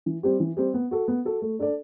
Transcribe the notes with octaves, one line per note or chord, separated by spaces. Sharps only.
E3
G3 C4 G4
E3
G3 C4 G4
B3
F#4 A4
B3
F#4 A4
A3
D4 A4 D5